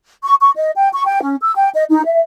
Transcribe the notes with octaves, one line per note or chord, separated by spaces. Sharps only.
C#6
C#6
D#5
G5
C#6
G5
C#4
E6
G5
D#5
D#4
E5